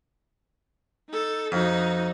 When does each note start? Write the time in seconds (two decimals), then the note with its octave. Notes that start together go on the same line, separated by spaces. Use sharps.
1.10 D#4 A4
1.52 F2 D#4 F#4